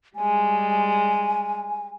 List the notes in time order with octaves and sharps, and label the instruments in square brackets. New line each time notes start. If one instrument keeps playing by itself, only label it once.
[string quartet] G3 G#3 [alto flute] G#5